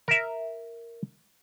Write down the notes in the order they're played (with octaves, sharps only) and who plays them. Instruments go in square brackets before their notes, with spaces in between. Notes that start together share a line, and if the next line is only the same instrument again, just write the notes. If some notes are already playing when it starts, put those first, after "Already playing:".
[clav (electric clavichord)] A#4 E5